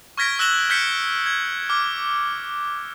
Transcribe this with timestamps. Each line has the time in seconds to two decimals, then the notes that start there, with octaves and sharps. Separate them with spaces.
0.18 C#6 F6 G#6 A#6 B6 D7
0.39 E6 F#6 A#6 E7 F#7 G7
0.70 F6 G6 B6 C#7 D7
1.26 G#6
1.69 D6 F6